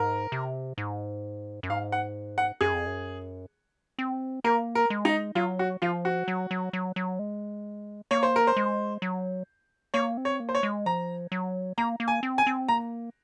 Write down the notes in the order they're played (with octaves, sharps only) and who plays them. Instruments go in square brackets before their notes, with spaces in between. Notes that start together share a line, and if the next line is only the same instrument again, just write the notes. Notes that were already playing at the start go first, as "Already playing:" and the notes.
Already playing: [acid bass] G#2 [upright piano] A#4
[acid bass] C3
G#2
F#2
[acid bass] G#2 [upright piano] F5
[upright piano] F#5
F#5
[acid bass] F#2 [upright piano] G#4
[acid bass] F2
F#2
C4
[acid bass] A#3 [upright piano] A#4
[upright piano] A#4
[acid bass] G#3
[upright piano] D#4
[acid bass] F#3 [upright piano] F4
[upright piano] F#4
[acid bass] F3 [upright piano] F4
[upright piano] F#4
[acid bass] F#3
F#3
F#3
F#3
G#3
[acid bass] A#3 [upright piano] C#5
[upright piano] C5
A#4
C5
[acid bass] G#3
F#3
[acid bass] A#3 [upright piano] C#5
[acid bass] C4
[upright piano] C#5
[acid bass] A#3
[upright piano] C5
C#5
[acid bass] G#3
[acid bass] F3 [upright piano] A#5
[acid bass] F#3
[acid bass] A#3 [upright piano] A#5
[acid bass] A#3
[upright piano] G#5
[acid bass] C4
[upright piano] G#5
[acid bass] C4
[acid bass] A#3 [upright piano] A#5